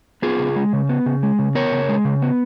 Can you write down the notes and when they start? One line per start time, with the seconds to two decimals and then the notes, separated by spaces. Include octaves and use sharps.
0.22 B3 F4 G#4
0.39 C#3
0.56 G#3
0.73 C#3
0.89 B3
1.06 C#3
1.23 G#3
1.39 C#3
1.55 B3 A#4 C#5
1.72 C#3
1.89 G#3
2.05 C#3
2.22 B3